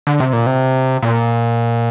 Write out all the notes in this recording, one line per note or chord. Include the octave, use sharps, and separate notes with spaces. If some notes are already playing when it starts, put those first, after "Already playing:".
D3
C3
A#2
C3
A#2